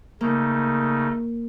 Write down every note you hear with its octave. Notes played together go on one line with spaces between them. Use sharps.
C#3 A3 A#3 D#4